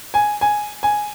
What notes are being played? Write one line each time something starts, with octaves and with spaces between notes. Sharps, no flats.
G#5
G#5
G#5